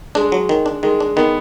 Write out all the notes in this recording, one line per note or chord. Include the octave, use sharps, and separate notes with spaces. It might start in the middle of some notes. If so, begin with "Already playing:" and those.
G#3 D4
F#3
D#3
D4
D#3 G#3
D4
D#3 B3